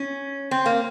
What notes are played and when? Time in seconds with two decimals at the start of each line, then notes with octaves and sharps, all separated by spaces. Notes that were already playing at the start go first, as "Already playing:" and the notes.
Already playing: C#4
0.51 C4
0.66 A#3